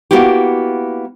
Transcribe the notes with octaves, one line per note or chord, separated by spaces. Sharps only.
A#3 B3 E4 F#4 G4